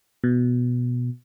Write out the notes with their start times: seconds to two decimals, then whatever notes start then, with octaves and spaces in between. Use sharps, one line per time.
0.24 B2